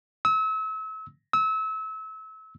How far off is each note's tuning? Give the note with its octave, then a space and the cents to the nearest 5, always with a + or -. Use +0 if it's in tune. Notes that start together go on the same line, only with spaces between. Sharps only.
E6 -35
E6 -30